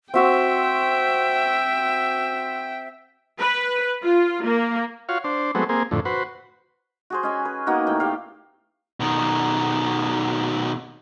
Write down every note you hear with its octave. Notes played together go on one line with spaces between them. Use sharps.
C4 F#4 E5 G5 D#6
B4
F4
A#3
F4 F#4 C#5 F5
D4 C5
F#3 G#3 A3 B3 C4
A#3 C4 G#4
F2 A2 D3
F#4 B4 C5
F#4 G#4 C5
C#4 D#5 G#5
B4
A#3 B3 D#4 F#4
A2 G5
G4 F5
B2 D#3